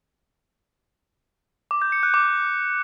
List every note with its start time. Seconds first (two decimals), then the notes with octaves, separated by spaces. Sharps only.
1.71 D6
1.82 G6
1.92 C#7
2.03 F#6
2.14 D6